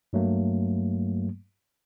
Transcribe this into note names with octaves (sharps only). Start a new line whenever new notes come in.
G2 F#3 A3 A#3